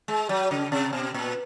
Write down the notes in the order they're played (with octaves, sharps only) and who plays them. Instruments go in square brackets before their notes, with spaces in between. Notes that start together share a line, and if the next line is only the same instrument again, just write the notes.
[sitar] G#3
F#3
C#3
C3
B2
A#2